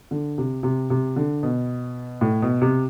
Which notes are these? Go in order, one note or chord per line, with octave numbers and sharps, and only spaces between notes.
D3
C3
C3
C3
D3
B2
A2
B2
C3